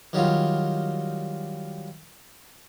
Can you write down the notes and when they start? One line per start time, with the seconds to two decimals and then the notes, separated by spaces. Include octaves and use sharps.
0.13 D#3 F#3 G3 F4